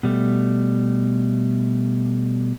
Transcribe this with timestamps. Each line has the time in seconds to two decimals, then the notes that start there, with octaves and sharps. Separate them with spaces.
0.03 B2 G3 A3